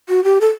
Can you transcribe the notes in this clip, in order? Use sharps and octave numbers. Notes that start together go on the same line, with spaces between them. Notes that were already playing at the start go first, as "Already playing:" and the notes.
F#4
G4
A4